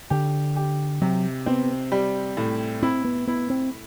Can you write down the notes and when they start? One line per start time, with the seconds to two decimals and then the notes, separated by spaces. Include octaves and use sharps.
0.10 D3 G4
0.56 G4
1.02 C3 F#3
1.46 B3 C4
1.92 G3
2.37 A2
2.82 C4 E4
3.05 B3
3.28 B3 E4
3.50 C4